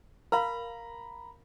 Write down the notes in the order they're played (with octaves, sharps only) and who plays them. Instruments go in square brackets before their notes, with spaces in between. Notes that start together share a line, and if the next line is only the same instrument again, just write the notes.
[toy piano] A#4 F5 [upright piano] A#5 B5